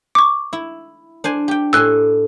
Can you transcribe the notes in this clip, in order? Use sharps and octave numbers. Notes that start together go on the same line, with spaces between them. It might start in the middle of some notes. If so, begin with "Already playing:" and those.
C#6 D6
E4
D4 C5 G#5
G4 G5
A2 G#5 C6 E6 F#6